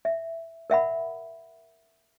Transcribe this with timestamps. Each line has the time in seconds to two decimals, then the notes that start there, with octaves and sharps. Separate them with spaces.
0.05 E5
0.70 A#4 E5 F#5 B5